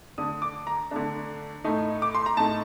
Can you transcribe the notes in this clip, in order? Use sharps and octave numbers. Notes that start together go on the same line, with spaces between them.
D3 A3 D4 D#6
D6
A#5
D3 A3 D4
A2 A3 D#4
D6
C6
A#5
A2 A3 D#4 A5